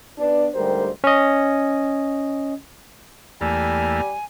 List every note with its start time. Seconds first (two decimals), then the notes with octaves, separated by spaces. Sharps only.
0.19 B3 D4
0.55 D2 G#2 G3 G4 A#4 C5
1.04 C#4 D#5
3.41 E2 G3 A3 A#3 G#5